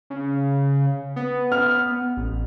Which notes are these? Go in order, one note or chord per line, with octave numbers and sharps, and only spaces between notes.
C#3
B3
F6
A1